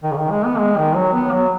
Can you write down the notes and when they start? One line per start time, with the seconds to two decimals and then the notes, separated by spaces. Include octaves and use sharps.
0.03 D#3
0.12 C#3
0.17 D#3
0.31 G#3
0.45 B3
0.58 G#3
0.77 D#3
0.96 F#3
1.13 B3
1.32 F#3